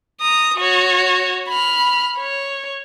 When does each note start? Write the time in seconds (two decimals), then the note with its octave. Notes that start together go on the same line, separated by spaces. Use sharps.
0.21 A#5 D#6
0.57 F#4 C#5
1.49 B5 F6
2.19 C#5